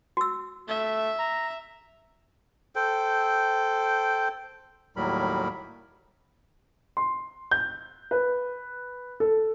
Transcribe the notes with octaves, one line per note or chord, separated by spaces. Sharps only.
F#4 E6
A3 E5
A#5
A4 C5 G5
D#2 A2 F#3 G3 A#4 B5
C6
G6
B4
A4